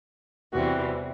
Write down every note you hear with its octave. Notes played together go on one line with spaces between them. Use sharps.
E2 C3 E3 G3 C4 F#4